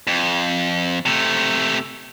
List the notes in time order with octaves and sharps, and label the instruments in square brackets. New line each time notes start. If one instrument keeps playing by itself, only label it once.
[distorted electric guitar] F2
C3 A3